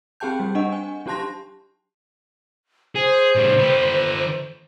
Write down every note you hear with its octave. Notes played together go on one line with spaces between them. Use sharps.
C4 G4 G#4 G5 A5 G6
G3
D4 D#5 F#5
G#5
F#3 D4 G4 A5 C6 A#6
G#4 C5
A2 G3
D3 B4